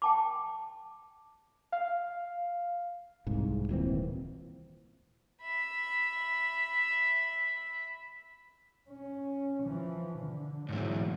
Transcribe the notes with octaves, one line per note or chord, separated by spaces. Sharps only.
G5 A5 D6
F5
C2 G#2
D#1 A#2 E3 C4
E5 B5
C#4
E3 F3
D3
G#2 E3 F#3